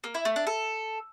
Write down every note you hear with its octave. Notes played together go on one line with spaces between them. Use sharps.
A#3
E4
A3
D4
A4